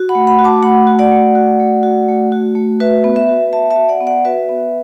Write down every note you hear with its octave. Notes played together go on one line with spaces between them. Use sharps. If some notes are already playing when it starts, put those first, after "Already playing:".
Already playing: F#4
F#5 B5
A3
F#5 B5
F#4
A5 D6
A3 F#5 B5
F#4
D5 F#5
A3
F#4
A3
F#4
A3
F#4
A3
F#4 B4 E5
B3
B4 E5
F#4
B3 E5 A5
E5 A5
F#4
D5 F#5
B3
D5 F#5
F#4 B4 E5
B3